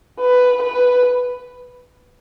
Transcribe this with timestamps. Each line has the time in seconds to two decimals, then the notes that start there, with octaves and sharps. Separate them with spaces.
0.20 B4
0.62 B4